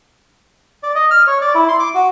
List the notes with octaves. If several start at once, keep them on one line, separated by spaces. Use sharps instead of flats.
D5
D#5
F6
C#5
D5
E4
C6
D6
F#4